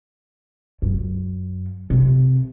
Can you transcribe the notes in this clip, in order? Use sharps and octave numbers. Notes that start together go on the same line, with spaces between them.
F#2
C3